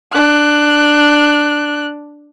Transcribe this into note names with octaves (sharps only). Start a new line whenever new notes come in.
D4 F#6